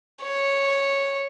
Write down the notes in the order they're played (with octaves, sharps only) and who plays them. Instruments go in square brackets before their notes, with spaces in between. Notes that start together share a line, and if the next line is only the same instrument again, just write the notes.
[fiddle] C#5